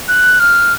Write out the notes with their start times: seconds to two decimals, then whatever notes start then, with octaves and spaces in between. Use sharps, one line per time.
0.08 F#6
0.40 F6